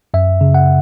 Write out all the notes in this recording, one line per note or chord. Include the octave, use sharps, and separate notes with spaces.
F#2 E5
C#3
F#5